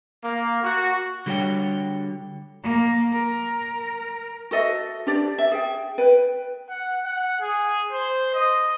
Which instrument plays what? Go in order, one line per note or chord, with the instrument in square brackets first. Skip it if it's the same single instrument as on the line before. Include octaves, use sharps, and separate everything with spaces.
[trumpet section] A#3
F#4
[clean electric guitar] D3 G3 F#4 A4 C#5 G5
[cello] A#3
A#4
[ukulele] F#4 A4 D#5 E5
D4 G4 D5
E5
G#4 G5
B4 G5
[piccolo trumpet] F#5
F#5
G#4
C5
D#5